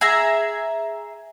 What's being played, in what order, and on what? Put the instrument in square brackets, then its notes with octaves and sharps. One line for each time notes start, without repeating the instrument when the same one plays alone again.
[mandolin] G#4 E5 A#5